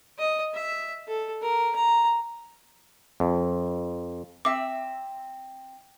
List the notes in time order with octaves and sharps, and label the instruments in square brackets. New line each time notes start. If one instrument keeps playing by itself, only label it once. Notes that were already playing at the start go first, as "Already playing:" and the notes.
[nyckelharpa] D#5
E5
A4
A#4
A#5
[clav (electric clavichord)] F2
[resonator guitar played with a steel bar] C4 E5 [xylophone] D6